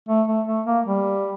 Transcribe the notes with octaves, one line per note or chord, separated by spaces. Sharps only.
A3
A3
A3
A#3
G3